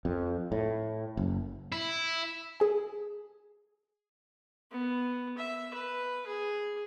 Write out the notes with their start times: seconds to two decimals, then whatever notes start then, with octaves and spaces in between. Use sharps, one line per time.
0.05 F2
0.52 A2
1.17 F#1
1.72 E4
2.60 G#4 G#5
4.71 B3
5.38 E5
5.74 B4
6.26 G#4